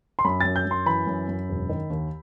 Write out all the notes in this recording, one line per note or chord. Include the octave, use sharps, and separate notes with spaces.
C6
F#2 B5
F#2 A6
G6
F#2 C6
E3 B5
F#2
F#2
E1
D#3
D#2